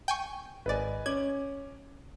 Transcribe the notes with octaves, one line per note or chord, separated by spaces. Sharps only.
G5 G#5 C#6
G#1 B4 D5 D#5 G#5
C#4 D6 G#6 F#7